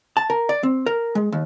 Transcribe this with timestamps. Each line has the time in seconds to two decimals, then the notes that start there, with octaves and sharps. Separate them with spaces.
0.17 A5
0.30 A#4
0.49 D5
0.63 C4
0.86 A#4
1.15 G#3
1.32 D#2